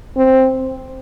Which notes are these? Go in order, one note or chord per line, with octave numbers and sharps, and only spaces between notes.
C4